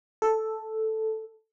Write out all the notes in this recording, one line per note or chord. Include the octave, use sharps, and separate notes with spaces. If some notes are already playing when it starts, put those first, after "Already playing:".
A4